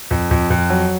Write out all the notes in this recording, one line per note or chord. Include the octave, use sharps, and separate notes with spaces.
F2
F2
F2
F#3